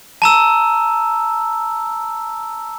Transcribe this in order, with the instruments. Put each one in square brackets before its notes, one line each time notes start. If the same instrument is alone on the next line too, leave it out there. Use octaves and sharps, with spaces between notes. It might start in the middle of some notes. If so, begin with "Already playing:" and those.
[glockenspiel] A5 A#5 E6